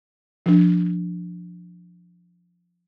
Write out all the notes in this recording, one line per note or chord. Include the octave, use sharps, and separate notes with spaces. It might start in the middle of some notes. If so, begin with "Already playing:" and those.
F3 D4